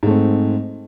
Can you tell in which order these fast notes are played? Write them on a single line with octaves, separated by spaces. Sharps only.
G#2 A3 C4